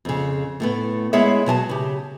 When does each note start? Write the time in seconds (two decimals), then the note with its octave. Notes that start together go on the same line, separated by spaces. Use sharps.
0.05 F2 C#3
0.60 A2 A3 B3
1.13 G#3 B3 E4 G#4 C#5 E5
1.46 B2 F#3 G#5 A5
1.69 C#3 G4